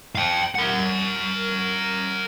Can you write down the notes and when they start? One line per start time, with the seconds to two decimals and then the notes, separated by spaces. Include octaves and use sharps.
0.15 F5 G5
0.55 A#4 F#5